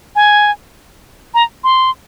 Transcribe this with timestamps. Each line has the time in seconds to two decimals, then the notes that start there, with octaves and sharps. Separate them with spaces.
0.16 G#5
1.34 A#5
1.64 C6